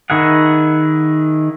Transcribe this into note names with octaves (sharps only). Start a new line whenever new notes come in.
D#3 E4 G#4 F#5